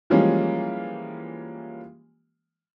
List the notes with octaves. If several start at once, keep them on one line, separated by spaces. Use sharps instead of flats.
E3 F3 G3 G#3 A#3 C#4